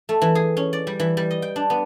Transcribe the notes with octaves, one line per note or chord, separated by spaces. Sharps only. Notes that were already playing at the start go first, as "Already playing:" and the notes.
A3
E3
G#4
C#4
D5
G3
E3
G3
D#5
G5
D4
B3